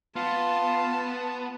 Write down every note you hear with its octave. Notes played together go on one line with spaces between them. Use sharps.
B3 F4 A5